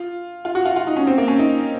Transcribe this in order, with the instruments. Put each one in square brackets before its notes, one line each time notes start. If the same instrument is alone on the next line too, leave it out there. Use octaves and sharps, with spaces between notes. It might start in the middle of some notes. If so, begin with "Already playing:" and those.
Already playing: [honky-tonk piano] F4
F4
F#4
F4
F4
D#4
C#4
C4
A#3
C#4
D#4